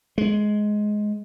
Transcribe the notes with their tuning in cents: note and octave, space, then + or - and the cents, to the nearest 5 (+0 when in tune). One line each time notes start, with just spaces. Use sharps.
G#3 +15